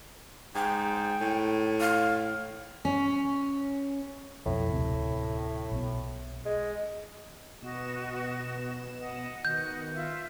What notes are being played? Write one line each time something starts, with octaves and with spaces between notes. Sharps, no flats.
G#2 G5
A2
F5
C#4
B1 F2 A2
D1 D2 C3
B1 B2
G#3
B2 B3 F#4 D#5 E7
D#5 F#5
D#3 B3 F#4 D#5 G6
F4 E5